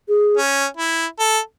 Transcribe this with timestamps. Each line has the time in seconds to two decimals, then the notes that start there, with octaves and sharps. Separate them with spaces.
0.08 G#4
0.37 C#4
0.77 E4
1.20 A4